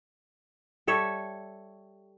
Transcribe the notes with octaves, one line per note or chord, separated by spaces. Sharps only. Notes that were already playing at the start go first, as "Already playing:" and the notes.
G3 A4 C#5 E5